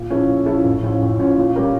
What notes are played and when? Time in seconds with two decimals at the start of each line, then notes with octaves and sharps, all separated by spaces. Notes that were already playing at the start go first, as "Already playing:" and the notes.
Already playing: A#2
0.10 F3 C#4 E4 A4
0.29 A#2
0.46 F3 C#4 E4 A4
0.64 A1
0.83 A2 F3 C#4 F4
1.02 A1
1.19 A2 F3 C#4 F4
1.38 A#2
1.56 G3 C#4 G4 A#4